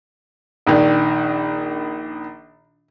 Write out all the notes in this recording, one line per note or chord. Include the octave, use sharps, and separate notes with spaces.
A#1 D#3 D4